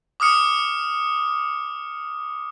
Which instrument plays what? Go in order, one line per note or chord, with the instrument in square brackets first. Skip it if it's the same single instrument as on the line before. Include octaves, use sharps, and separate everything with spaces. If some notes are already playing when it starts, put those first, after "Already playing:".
[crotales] D6 D#6 F6 C#7